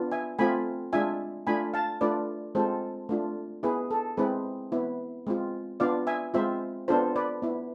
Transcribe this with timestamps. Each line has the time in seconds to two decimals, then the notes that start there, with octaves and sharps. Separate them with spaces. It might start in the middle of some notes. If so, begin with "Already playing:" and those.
Already playing: B3 D4 F4
0.12 E5 G#5
0.39 A3 C4 F4 G#5 B5
0.93 G#3 D4 F4 E5 G#5
1.47 A3 D4 F4 G#5 B5
1.74 F5 A5
2.01 A3 D4 F4 B4 D5
2.55 G#3 C4 F4 A4 C5
3.09 A3 D4 F4
3.63 B3 E4 G#4 B4
3.91 A4
4.17 G#3 C4 E4 G#4 B4
4.72 B3 E4
5.27 G#3 C4 F4
5.80 B3 D4 F4 D5 F5
6.07 E5 G#5
6.34 G#3 C4 F4 C5 E5
6.88 B3 D4 F4 A4 C5
7.16 B4 D5
7.42 B3 E4